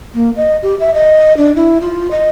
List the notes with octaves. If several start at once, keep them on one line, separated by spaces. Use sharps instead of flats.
A#3
D#5
G4
E5
D#5
D4
E4
F4
D#5